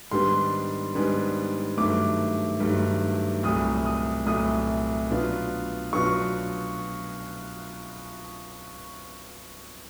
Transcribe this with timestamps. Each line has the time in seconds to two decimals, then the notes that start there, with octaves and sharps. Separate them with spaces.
0.11 G#2 D#3 G3 B3 D4 C6
0.95 G#2 D#3 G3 B3 D4
1.77 G2 D#3 F#3 A3 D6
2.60 G2 D#3 F#3 A3
3.43 C2 A#2 F#3 A3 D#6
3.85 D#6
4.26 C2 A#2 F#3 A3 D#6
5.10 B2 F#3 B3 D4 F4
5.93 B2 F#3 B3 D4 F4 C#6